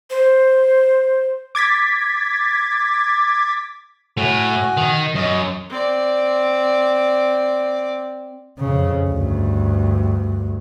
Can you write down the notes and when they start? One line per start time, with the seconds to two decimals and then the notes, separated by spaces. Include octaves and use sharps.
0.10 C5
1.55 D6 G#6 A6 B6
4.17 A2 F#4 G#5
4.77 D#3
5.15 F#2 D#5
5.70 C4 D5
8.59 F2 C#3
9.08 D2 G2